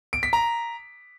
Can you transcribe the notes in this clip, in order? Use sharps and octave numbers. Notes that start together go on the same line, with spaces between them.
D7
B6
A#5